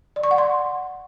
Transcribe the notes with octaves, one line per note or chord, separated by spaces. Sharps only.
D5
C#6
F#5
C6